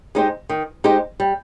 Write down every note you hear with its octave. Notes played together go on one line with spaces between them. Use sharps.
G#3 D#4 G4 C5
D#3
G#3 D#4 G4 C5
G3